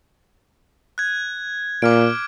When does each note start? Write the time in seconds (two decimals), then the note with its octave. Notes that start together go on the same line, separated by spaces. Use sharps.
0.98 F#6 G#6
1.82 A#2 D6 F6 D7